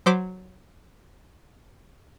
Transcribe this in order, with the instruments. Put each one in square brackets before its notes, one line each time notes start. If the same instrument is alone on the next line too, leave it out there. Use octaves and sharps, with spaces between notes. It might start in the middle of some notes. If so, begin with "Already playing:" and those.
[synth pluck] F#3 C5 D6 B6